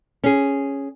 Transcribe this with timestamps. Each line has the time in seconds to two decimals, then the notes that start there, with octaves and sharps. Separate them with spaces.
0.24 C#4 G#4